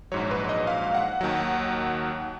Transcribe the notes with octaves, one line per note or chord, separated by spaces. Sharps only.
A#1 G#2 F#3 C#5
B4
D#5
F5
F#5
D#2 D#3 F#3